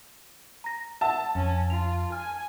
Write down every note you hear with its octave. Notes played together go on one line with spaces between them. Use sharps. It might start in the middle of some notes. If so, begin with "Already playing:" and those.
A#5 A#6
E5 F#5 A5 E6
F2 C#4
F4 F7
G#5 F6